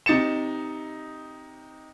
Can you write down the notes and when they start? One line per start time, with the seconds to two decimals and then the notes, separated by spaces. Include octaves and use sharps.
0.06 C3 D#4 A6 C#7 E7